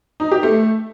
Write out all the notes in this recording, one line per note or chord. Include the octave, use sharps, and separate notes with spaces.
D#4
G4
A3